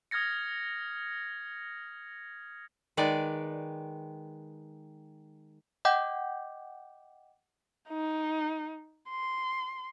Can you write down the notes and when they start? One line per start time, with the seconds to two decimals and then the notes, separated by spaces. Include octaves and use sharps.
0.11 D#6 F6 G#6 A#6 C#7
2.97 D#3 G#3 B4 D5
5.85 D#5 F#5 G5 D6 G6
7.89 D#4
9.10 C6